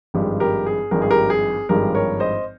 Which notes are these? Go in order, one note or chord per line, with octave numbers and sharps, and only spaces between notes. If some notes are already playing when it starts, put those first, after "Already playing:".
G#1 G2 F3 G#3 G4
G4 A#4
G#4
G#1 G2 F3 G#3 A#4
G#4
G4 A#4
G#4
G#1 G2 F3 G#3 G4 A#4
A#4 C#5
C5 D#5